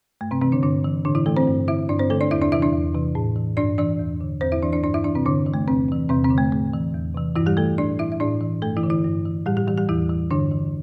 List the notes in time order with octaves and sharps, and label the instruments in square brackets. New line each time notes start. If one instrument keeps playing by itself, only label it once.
[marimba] G2 A3
C3 C4
C3 E3 C4
D3 D4
G2 D3 D4
E3
A2 D3 D4
E3 E4
E3 A3 A4
C4 C5
G2
D3 E4 E5
G2 D4 D5
C4 C5
D3 A3 A4
D4 D5
E2 E4 E5
D4 D5
C3 E3 E4 E5
D4 D5
E2
C3 E3
A2
E3
G2 D4 D5
E3 D4 D5
E2
D3
E2 C4 C5
E4 E5
E3 D4 D5
D4 D5
G2 D4 D5
E4 E5
E3 D4 D5
C3 C4
G2 D3 D4
E3
A3
E2 C3 C4
C3 E3
E2 C3 C4
C3 C4
D3
A3
A2 A3
E3
E2
C3 E3
G2 E3 E4
G3 G4
E3 A3 A4
A2 D4 D5
E3 E4 E5
E5
A2 D4 D5
E3
G2 A3 A4
E3 E4
D3
E3 E4
G2
E3
A2 G3 G4
G3 G4
E3 G3 G4
G3 G4
E2 E3 E4
E3
G2 D3 D4
E3